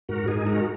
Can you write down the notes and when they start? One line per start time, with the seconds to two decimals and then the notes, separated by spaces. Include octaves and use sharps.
0.09 G#2 F#4 A#4
0.28 G#2 D#4 G#4
0.46 G#3 F#4 A#4